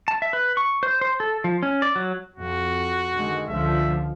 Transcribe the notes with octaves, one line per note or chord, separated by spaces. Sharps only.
A5
E5
B4
C#6
C5
C5
A4
F3
C#4
D5
F#3
F2 F#4
D3 D#3 G#3
C#2 D3 F3 E5